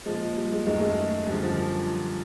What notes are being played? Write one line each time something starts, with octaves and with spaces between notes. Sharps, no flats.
A#2 F3 G#3
G3
G#3
F#2 D#3 G#3
A3
G#3
F#2 D3 F3 G3
F3